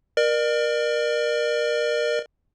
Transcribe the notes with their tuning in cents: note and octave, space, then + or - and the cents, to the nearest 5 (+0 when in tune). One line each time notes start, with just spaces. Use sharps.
A#4 +20 D5 +40